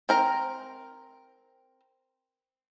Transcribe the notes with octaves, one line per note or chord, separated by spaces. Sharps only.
C4 A#4 A#5